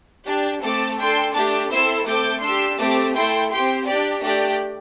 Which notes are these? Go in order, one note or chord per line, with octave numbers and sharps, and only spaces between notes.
D4 G4
A3 C4 A4 A5 D6
D4 A4 G5 C6
A3 D4 G4 A5 D6
C4 E4 A4 C6 E6
A3 C4 A4 D6 G6
D4 G4 C6 E6
A3 C4 G4 A5 D6
A3 E4 A4 G5 C6
C4 G4 G5 C6
D4 G4 D5 G5
A3 D4 G4 D5 G5